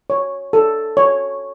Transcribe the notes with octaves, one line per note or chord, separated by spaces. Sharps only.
C#5
A4
C#5